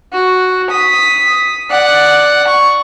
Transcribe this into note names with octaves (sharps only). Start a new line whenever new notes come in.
F#4
D#6 B6
D5 F#5
C#6